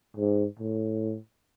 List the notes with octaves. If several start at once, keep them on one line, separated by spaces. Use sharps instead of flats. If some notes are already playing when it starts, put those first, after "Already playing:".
G#2
A2